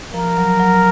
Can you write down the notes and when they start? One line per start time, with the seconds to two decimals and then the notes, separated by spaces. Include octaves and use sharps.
0.14 F3 A#4
0.37 F#3
0.60 F#3